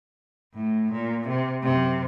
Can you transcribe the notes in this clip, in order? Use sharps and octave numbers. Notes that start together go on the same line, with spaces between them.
A2
A#2
C3
F#2 C3